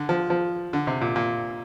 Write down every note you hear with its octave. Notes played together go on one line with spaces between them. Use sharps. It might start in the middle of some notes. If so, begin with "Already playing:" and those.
Already playing: D3
F3
F3
D3
C3
A#2
A#2